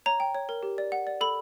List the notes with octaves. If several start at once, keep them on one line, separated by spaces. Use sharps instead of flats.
C#5 A#5
G5
C#5
A#4
G4
D5
F#5
D5
A4 B5